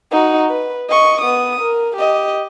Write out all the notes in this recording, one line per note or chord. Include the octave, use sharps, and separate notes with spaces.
D#4 F#4
B4
D#5 C#6
B3 D#6
A#4
G4 D#5